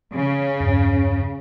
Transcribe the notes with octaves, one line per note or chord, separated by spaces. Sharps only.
C#3
E2 G2